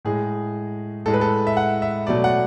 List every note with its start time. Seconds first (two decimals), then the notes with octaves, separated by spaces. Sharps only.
0.05 A2 G#3 G#4
1.06 A2 G#3 A4
1.14 B4
1.21 A4
1.47 E5
1.57 F#5
1.82 E5
2.07 B2 F#3 A3 D5
2.24 F#5